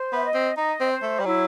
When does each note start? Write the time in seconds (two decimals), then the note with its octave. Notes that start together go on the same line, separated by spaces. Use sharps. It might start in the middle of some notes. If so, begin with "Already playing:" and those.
Already playing: C5
0.12 B3 E5
0.24 D#5
0.34 C4
0.57 D#4 D#5
0.80 C4
0.91 C5
1.03 A3
1.20 G3
1.25 F#3 E4